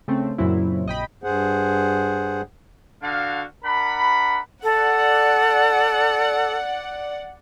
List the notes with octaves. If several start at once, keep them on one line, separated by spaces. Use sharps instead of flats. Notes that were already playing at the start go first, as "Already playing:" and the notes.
C#3 A3 C4
F#2 A#2 C#3 F#3 C4 E4
A#1 D#5 G5 B5
G2 G#4 C5 F#5
D3 F#4 F5
D4 A#4 F#5 B5
A4 D5 F#5